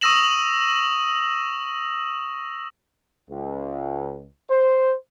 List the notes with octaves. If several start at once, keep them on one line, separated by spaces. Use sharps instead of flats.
C#6 D#6 E6 A#6 E7 F#7
C#2
C5